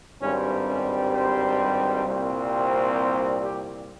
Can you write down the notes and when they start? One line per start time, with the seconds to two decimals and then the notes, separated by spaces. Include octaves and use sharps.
0.21 G#1 G2 G3 C4 C#4
0.68 C#4
1.13 C5
2.05 C2 A#2 G3 C4
2.97 A#4
3.42 G4